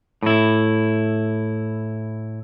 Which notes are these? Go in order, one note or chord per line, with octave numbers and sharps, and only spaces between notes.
A2 E4